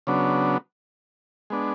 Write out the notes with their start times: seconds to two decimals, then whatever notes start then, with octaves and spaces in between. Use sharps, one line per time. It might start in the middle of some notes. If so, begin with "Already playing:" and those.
0.07 C#3 F#3 B3 D4
1.50 G#3 B3 D4